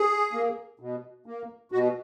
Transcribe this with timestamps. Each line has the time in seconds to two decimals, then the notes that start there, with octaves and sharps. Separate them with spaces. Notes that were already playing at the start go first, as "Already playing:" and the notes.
Already playing: G#4
0.33 A#3
0.80 B2
1.26 A#3
1.72 B2 F#4